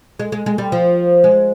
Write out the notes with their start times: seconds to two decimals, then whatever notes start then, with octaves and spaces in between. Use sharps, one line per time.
0.19 G#3
0.32 G#3
0.46 G#3
0.58 G3
0.72 F3
1.24 G#3